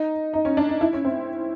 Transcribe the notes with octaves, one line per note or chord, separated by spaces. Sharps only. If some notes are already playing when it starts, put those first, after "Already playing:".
Already playing: D#4
D#4
C#4
D4
D#4
E4
C#4
C4